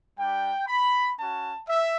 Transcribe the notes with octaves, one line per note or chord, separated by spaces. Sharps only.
G3 D4 G4 G5
B5
C#4 F#4 A5
E5